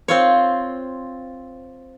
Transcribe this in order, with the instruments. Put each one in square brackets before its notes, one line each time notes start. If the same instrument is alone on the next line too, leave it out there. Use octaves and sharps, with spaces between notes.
[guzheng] C4 F4 C#5